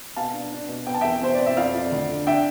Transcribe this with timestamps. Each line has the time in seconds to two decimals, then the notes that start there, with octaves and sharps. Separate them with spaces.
0.16 B2 F5 A5
0.34 D4
0.52 D4
0.68 B2
0.86 B3 G5
0.94 A5
1.01 E2 E5 G5
1.22 B2 C5
1.34 C4 D5
1.46 E5
1.56 F2 D5 F5
1.74 F2
1.92 D2
2.09 D3
2.27 D4 E5 G5